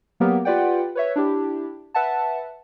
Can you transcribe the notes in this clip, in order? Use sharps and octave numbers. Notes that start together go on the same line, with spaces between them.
F#3 A#3 B3 G4 A#4
F4 G4 B4 D5 F#5 G5
B4 C#5 E5
D4 E4 G4
B4 E5 F#5 A5